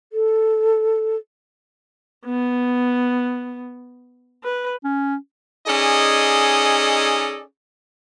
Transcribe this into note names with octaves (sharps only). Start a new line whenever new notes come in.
A4
B3
B4
C#4
C#4 D#4 G#4 A4 D5 D#5